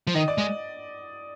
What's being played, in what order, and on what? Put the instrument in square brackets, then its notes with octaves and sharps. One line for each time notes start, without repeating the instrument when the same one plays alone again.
[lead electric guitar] F3
[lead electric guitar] D#3 [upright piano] D#5
[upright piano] D5
[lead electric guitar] G#3 [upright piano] D#5